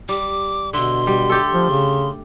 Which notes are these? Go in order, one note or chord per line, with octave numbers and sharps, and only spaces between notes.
G3 D6
B2 D3 E5 C6
G3
A3 G4 A4
F3
C#3